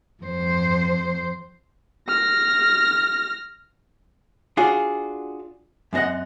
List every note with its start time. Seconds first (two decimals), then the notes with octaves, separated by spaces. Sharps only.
0.23 F2 C5
2.08 F6 A#6
4.57 D4 F4 F#4 G#4 C#5
5.93 F#2 C4 D4 D#5 F#5